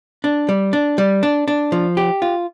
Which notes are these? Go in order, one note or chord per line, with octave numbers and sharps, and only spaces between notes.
D4
G3
D4
G3
D4
D4
F3
G4
F4